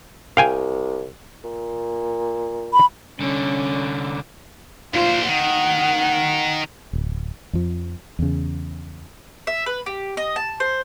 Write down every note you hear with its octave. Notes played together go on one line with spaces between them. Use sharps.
C2 F5 G5 G#5
A#2
B5
C2 D3 C#4
A#2 F4 C5
D#3 F#5
D1
F2 F3
E2 C#3
E5
B4
G4
D#5
A5
C5